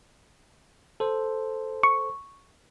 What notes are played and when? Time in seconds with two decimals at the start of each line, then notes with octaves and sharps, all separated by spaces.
1.00 A4 C5
1.83 C#6